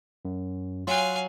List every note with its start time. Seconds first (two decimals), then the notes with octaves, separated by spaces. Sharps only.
0.25 F#2
0.87 F#3 F4 F5 G#5 C6 F#6